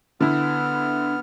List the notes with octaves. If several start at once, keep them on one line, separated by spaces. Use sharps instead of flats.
D3 B3 E4 F6